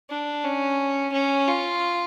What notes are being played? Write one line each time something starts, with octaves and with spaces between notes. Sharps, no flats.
D4
C#4
C#4
F4